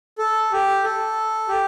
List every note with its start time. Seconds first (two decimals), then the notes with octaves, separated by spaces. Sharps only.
0.18 A4
0.52 G4
0.84 A4
1.48 G4